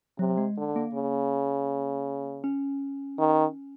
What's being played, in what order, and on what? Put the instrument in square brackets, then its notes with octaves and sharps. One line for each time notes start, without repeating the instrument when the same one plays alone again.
[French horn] C3 [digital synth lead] F#3
[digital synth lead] G#3
[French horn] D3
[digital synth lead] A#3
[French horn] C#3
[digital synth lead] C#4
[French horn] D#3